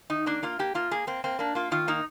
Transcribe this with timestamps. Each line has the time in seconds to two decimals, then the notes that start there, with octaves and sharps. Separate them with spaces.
0.10 D#3 D#4
0.26 A#3 D4
0.43 A#3 F4
0.59 A#3 G4
0.75 A#3 F4
0.91 A#3 G#4
1.07 A#3 C4
1.24 A#3 C4
1.39 A#3 D4
1.55 A#3 F4
1.71 D#3 F4
1.88 A#3 D#4